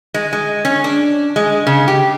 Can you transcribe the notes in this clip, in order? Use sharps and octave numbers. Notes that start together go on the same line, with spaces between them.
G#3
G#3
C#4
D4
G#3
C#3
G4